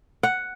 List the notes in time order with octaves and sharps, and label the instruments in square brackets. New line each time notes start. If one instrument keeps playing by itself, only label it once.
[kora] F#5